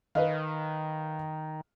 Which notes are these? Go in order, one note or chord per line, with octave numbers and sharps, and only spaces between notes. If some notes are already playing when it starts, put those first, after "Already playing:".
D#3 B4 D#5 F5